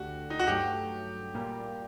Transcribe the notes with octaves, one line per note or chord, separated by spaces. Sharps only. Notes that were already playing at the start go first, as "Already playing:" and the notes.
Already playing: D2 D3 A3 D4 F#4 G4
D#4
F#4
G2 F#3 A3 G4
A#2 G3 A#3